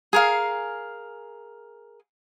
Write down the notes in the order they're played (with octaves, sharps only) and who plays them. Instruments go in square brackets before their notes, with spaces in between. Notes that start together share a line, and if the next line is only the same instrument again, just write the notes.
[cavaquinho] G#4 A#4 F5